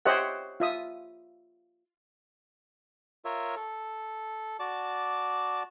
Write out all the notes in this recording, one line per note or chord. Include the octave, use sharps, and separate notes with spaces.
G4 C5 C#5 D#5 E5 F#5
F4 E5 D#6
F4 A#4 C#5 E5
A4
F#4 D5 A5 D6